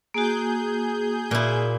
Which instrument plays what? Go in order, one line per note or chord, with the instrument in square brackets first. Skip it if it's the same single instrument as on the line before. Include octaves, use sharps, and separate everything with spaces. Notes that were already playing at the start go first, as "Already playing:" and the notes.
[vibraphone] A#3 F#4 [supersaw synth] G#4 G6
[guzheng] A#2 E4